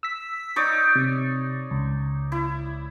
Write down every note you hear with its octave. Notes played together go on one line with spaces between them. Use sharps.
E6 B6
D#4 C#5 D5
C3
C#2
E4